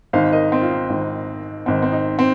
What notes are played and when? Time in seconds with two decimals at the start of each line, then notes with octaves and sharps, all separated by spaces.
0.13 G#1 G#2 D#3 C5 F5
0.32 A#4 D#5
0.52 C4
0.62 F4
0.71 D#4
0.90 G#1 G#2 D#3
1.66 G#1 G#2 D#3 C4
1.82 C4
1.92 D#4
2.19 C4